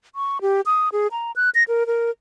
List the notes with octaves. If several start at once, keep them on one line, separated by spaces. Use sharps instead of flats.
C#6
G4
D#6
G#4
A#5
F#6
A#6
A#4
A#4